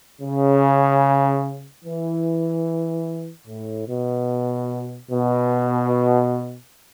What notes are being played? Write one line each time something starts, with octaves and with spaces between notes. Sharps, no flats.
C#3
E3
A2
B2
B2